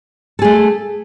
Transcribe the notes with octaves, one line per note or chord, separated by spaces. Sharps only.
A3 G#4 A4